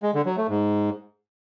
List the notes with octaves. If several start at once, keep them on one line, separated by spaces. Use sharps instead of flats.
G#3
D3
F#3
A3
G#2